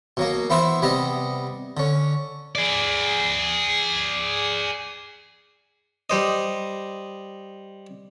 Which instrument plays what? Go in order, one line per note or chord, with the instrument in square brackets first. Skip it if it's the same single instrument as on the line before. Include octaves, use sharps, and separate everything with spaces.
[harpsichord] B2 F#3 A#3
E3 B3 E4 C5 E5
C3 G3 B3 D#5
D3 C#4
[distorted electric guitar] G#4 D5
[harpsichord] G3 C5 D#5